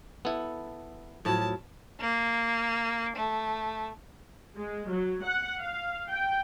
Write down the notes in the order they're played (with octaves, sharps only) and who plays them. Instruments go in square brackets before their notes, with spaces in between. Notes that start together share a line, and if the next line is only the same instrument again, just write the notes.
[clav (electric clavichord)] B3 E4 [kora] A4
[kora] A2 F3 F#3 [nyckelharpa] A5
[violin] A#3
A3
[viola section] G#3
F#3
F#5
F5
G5